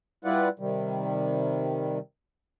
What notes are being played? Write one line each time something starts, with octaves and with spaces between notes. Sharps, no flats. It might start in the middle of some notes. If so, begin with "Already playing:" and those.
G3 E4 F4 B4 D5 F#5
C3 D#3 G3